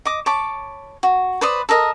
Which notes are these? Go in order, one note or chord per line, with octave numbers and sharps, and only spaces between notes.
D#5 D6
C#5 A5 B5 D6
F#4
B4 C5 D5 D#6
A4 A#4 D#5 D#6